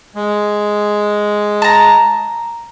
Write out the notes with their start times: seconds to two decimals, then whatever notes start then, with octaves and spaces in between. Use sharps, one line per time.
0.15 G#3
1.62 A5 A#5